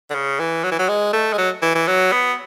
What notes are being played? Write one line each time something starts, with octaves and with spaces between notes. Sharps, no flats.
D3
C#3
E3
F#3
E3
F#3
G#3
A3
G#3
F#3
E3
E3
F#3
B3